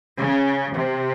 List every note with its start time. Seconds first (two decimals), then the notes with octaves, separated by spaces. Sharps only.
0.17 C#3
0.74 C3